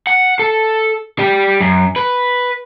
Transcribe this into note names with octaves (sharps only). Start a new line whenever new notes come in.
F#5
A4
G3 G4
F#2
B4